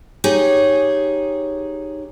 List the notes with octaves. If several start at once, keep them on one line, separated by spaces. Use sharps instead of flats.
D#4 G4 G#4 C#5